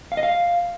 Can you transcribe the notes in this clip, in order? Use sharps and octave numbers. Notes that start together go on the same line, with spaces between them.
F5
D#5
F5